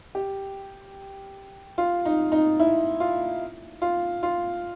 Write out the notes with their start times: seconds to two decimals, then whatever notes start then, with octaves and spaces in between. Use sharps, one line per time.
0.15 G4
1.78 F4
2.05 D#4
2.32 D#4
2.60 E4
3.00 F4
3.82 F4
4.23 F4